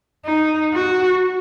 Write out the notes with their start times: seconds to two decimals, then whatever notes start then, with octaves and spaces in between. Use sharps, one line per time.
0.25 D#4
0.74 F#4